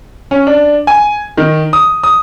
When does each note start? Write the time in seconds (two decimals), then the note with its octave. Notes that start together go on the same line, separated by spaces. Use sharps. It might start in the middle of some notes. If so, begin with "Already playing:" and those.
0.31 C#4
0.47 D4
0.87 G#5
1.38 D#3
1.73 D#6
2.03 D#6